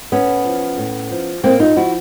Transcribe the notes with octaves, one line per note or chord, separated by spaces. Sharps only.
A2 B3 C#4
F3
A2
F3
A2 A#3 C4
D#4 F4
F3 E4 F#4